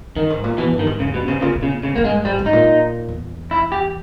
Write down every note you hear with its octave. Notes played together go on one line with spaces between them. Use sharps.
G2 D#3
G#2
A#2
B2 E3
G2
D#3
G#2
E2 C#3
G2 B2
G#2 C#3
A#2 C#3
B2
C#3
A#2
G#2 C#3
G#2 A#3
G#3
G2
G#2 G3
G#2
D#4
A#2
E2
E4
G4